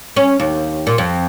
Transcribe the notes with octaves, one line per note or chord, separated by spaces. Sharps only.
C#4
D#2
A#2
F2